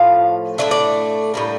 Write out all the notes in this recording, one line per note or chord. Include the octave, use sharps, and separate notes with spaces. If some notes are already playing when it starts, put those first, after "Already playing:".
Already playing: A2 F3 F5
A2 E3 A3 D4 E5
D5
A2 G3 A#3